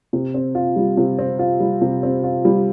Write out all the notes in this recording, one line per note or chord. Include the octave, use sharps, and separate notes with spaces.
C3
C4
F4
G3
C3
C4
F4
G3
C3
C4
F4
G3